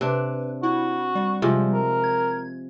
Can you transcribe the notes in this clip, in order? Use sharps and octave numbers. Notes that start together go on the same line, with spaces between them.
C3 D4 B4
E4 F#4
G3
C3 F3 G#3
A#4
G#6